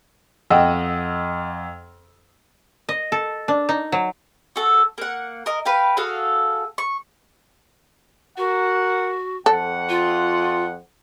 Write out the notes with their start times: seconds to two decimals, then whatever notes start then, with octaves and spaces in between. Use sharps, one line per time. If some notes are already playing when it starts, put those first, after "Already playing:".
0.50 F2 D#5 F#5 G5 E6
2.89 D#5
3.12 A4
3.48 D4
3.69 D#4
3.92 F#3
4.56 F#4 A4
4.98 A#3 F#5
5.46 A#4 D#5
5.65 B4 F5 G5
5.97 F#4 G#4 A4 F5
6.78 C#6
8.37 F#4 A#4 F#5
9.46 F2 A4 F#5
9.89 F4